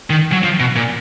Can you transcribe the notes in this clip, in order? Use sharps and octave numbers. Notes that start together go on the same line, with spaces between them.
D#3
F#3
F3
B2
A#2